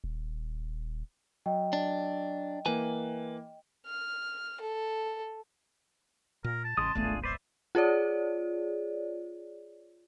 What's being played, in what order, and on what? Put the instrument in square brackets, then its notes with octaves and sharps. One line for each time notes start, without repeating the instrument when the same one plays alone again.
[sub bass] D#1
[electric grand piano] F#3 [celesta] D#5 G5
[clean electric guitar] D4
[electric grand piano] E3 A#3 [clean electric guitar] B4 G#5
[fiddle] F6
A4
[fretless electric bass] A#2 [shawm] A#4
[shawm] A5
[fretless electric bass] A1 [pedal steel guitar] C#3 G#3 D#6 [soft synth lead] C6
[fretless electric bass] D1 G#1 B3 [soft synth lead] A3 [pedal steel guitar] D4 F4 G#4
[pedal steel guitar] B4 D5 E5 [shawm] C5 [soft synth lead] D6
[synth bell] F4 G#4 C#5 D5